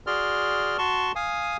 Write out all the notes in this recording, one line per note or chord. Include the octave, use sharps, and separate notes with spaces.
F#4 G#4 D5 C6 F6
F#4 A5 C6 C#6
F5 G#5 D#6